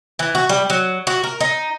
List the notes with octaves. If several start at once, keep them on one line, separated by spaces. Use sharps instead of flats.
E3
F#4
G3
F#3
F#4
A#4
D#4